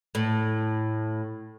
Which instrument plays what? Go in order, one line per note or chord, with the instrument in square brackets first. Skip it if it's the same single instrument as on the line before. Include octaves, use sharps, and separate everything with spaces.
[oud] A2